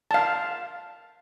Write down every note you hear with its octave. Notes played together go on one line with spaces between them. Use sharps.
F5 A5